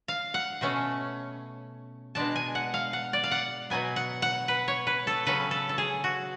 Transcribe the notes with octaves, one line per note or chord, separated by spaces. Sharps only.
F5
F#5
B2 A3 C#4
B2 G#3 D4 A5
G#5
F#5
F5
F#5
D5
F5
F#5
B2 F#3 B3 G#5
F#5
F#5
B4
C#5
B4
A4
C#3 F#3 C#4 B4
A4
A4
G#4
F#4